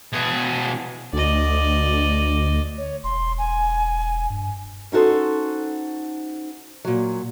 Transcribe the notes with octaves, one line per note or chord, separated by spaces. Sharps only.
B2 G#4
D2 D5 D#5
C#5
E1 C6
G#5
G2
C#4 D#4 F#4 A4 C5
A#2 F#3